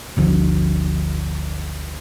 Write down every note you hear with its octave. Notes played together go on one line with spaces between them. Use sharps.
G1 D2 F3